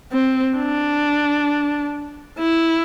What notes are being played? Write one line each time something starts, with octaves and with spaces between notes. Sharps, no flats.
C4
D4
E4